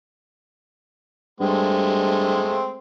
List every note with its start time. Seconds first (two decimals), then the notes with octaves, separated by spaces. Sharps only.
1.40 G2 G#3 A3 C4